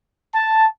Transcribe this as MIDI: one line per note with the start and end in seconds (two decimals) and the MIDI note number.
0.34 0.67 81